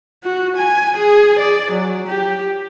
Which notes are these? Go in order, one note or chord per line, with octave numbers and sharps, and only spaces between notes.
F#4
G#5
G#4
D5
F#3
G4